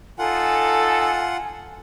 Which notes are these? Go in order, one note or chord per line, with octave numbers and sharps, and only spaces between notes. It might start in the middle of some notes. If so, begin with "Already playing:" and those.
D#4 F4 A4 F#5 G#5